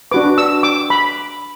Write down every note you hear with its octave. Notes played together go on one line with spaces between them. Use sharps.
D4 F#4 B4 D6
E6
D6
B5